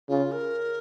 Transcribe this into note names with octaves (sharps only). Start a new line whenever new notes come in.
C#3 F4
A#4